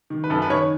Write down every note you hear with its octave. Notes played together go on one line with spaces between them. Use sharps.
D#3
B4
F#2 A4
B4
D#3 C#5